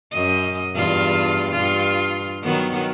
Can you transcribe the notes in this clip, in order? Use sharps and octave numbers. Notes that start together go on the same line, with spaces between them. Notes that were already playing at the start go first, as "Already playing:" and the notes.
F#2 D#5
E2 G2 F4
G2 F4
D#3 F#3 B3